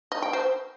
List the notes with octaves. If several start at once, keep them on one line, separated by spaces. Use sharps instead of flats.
D#5
G5
C5